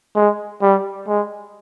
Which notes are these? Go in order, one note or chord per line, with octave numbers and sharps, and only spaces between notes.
G#3
G3
G#3